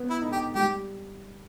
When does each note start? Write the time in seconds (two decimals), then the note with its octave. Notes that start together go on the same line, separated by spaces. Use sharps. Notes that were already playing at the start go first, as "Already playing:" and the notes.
Already playing: B3
0.10 E4
0.21 D#4
0.32 G4
0.55 G3 G4